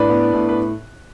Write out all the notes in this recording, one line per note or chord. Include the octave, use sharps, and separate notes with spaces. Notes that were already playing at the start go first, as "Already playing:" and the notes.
Already playing: A2 D4 B4 D5
B3
A2
B4